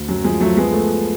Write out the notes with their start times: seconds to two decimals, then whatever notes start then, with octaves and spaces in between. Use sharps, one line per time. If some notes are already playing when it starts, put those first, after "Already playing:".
Already playing: D2
0.09 F#2 F#3
0.24 F3 G#3
0.41 F3 F#3 A3
0.57 G#3 B3
0.73 A3